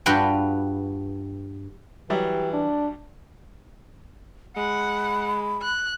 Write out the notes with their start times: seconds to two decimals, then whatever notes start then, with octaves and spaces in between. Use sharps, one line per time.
0.06 G2 F4 F#4 B4 F#5 G5
2.10 E3 F#3 G3 G4 E5
2.53 D4
4.57 G#3 F#5 B5
5.62 F#6